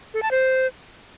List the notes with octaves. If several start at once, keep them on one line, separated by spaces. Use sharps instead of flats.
A4
A5
C5